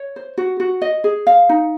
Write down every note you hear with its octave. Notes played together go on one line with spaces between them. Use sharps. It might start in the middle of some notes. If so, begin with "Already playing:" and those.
Already playing: C#5
C5
F#4
F#4
D#5
G#4
F5
D#4